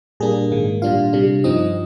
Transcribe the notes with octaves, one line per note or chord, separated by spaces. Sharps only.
A#2 G3 A#3 D4 G#4
G#2 D#3 A#3
A#2 G3 D4 F4 F5
C3 G3 D4
G2 F3 C4 D#4 D#5